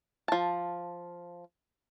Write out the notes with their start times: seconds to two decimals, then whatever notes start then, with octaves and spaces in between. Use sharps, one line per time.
0.28 F3 A5